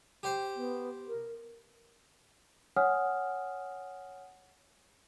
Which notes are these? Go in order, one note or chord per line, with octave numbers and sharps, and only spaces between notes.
G4 C5
B3
A#4
C#5 F#5 G#5 D#6 F6